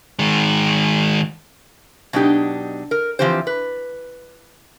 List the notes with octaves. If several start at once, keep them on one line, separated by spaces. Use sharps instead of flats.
D#3 G#3
B2 F#3 D4 D#4 G4
A#4
E3 F3 C4 G4 C5
B4